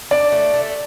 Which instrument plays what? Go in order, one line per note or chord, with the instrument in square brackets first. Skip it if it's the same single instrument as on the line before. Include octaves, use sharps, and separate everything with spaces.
[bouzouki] D4 [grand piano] D5
[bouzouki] A3
A3